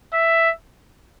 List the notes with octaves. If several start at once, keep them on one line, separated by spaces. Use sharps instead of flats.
E5